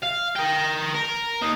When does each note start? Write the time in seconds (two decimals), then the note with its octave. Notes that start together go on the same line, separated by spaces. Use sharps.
0.02 F5
0.36 A#4 G5
0.95 A#4
1.42 A#3 D#4